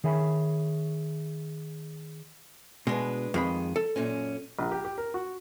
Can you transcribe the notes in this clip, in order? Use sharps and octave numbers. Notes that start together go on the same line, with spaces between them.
D#3 G#4 C#5 E5 G#5 B5
B2 G#3 D4 B4
F2 D#3 G#3 B5
A4
F#2 A#2 C#4
A#1
G4
G4
A#4
F#4